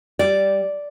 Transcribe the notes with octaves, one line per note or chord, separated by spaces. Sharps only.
G3 D5